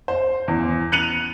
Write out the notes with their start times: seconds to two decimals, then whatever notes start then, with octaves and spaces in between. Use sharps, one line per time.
0.08 C5
0.48 E2
0.92 F#6 C#7 D#7 F7 F#7